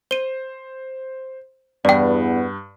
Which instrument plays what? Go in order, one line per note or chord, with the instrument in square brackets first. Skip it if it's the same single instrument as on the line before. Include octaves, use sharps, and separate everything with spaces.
[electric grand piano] C5 [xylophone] D#7 G7
[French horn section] E2 B3 [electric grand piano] G2 [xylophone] D5 G5